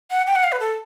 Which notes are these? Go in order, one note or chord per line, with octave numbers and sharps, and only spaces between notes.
F#5
G5
F#5
F5
B4
A4